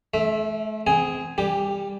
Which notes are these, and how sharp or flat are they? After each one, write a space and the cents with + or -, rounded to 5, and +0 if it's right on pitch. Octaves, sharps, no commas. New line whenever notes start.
A3 -40 E5 +0
C4 -30 G#4 +0 G#5 +0
G3 +20 G4 +0